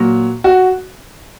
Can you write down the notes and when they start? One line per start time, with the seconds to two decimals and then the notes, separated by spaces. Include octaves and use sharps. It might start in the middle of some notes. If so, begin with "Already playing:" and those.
Already playing: A#2 F#3
0.44 F#4